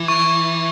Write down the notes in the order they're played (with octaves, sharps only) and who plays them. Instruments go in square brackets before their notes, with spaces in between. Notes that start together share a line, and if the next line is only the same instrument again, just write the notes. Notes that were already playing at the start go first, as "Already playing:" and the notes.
Already playing: [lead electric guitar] E3
[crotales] C#6